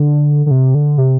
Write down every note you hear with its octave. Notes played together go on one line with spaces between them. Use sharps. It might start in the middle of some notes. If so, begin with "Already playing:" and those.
Already playing: D3
D3
C3
D3
C3